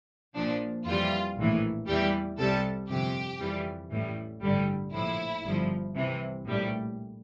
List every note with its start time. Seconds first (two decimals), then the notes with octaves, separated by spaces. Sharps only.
0.34 A#1 A#2 F3 D4
0.85 F2 E3 G3 F4
1.37 A#1 A2 E3
1.87 E2 E3 G3 G4
2.38 C2 C3 G3 A4
2.88 G1 F2 C3 G4
3.39 F2 E3 G3
3.90 A1 A2 E3 G3
4.42 A1 G2 D3 G3
4.92 A#1 A2 F3 E4
5.43 G1 G2 F3
5.94 C2 C3 E3
6.44 A#1 A2 G3